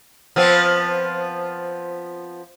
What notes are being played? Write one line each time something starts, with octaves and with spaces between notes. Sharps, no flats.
F3 B3 C4